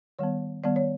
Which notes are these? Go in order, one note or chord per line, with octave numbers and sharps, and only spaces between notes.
D#3 G3 B3 C#5
D#3 G3 B3 D5
C#5